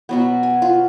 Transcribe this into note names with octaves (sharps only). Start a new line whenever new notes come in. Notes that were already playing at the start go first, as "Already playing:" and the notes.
B2 F#3 B3
G#5
F4